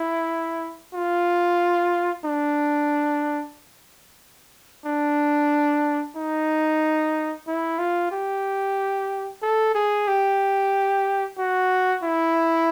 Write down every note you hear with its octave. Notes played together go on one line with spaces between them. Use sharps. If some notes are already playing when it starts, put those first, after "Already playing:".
Already playing: E4
F4
D4
D4
D#4
E4
F4
G4
A4
G#4
G4
F#4
E4